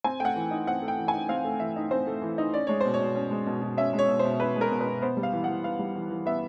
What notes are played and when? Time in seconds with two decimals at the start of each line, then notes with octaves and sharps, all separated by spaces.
0.04 C4 G#5
0.20 A3 F#5 G5
0.36 E3
0.51 D#4
0.67 C4 F#5
0.82 A3
0.88 G5
0.98 E3
1.08 G#5
1.14 D#4
1.29 C4 F5
1.44 A3
1.60 E3 E5
1.76 D#4
1.91 C4 C5
2.07 A3
2.22 E3
2.38 D#4
2.54 C#4 D5
2.67 G#3 C#5
2.81 B2 C5
2.94 C#5
3.00 B2
3.15 C#4
3.31 G#3
3.46 B2
3.62 B2
3.77 C#4 E5
3.93 G#3
3.99 C#5
4.08 B2
4.19 C5
4.24 B2
4.40 C#4 B4
4.56 G#3
4.61 A#4
4.71 B2
4.81 B4
4.87 B2
5.02 B3 C5
5.17 G3
5.23 F5
5.33 E3
5.44 E3 F#5
5.64 B3 F5
5.79 G3
5.95 E3
6.10 E3
6.26 B3 E5